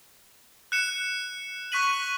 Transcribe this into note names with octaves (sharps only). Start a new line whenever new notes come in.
F#6 C#7 E7
C#6 F#6 B6 D#7 F#7